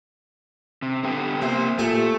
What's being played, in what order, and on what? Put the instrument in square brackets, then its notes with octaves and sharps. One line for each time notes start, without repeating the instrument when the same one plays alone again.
[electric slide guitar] C3
D3 B3 G4
[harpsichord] C3 [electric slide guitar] A#3 C5
[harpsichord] A#2 G4 G#5 [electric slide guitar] A3